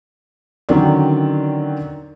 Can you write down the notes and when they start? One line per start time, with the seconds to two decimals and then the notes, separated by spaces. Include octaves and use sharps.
0.69 D3 D#3 F#3 C4 C#4 D5